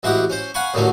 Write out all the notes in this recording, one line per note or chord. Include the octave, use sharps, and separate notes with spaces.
A1 G#3 E4 F#4 G4 F#5
C#4 C5
F5 F#5 G#5 B5 C#6
D#2 A2 D3 D#3 F#3 C#4